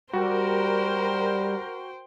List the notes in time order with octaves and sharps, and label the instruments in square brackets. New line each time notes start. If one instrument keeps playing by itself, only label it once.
[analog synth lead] G3 [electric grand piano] F#4 [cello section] A#4 [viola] C5 G5